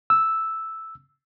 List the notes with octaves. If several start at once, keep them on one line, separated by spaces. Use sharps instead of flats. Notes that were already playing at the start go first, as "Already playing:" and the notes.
E6